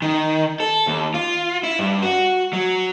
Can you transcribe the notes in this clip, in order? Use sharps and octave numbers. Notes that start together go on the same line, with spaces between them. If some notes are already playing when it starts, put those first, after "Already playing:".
D#3
A4
D#2
F4
E4
G2
F#4
F#3